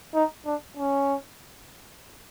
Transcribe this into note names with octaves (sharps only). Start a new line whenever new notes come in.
D#4
D4
C#4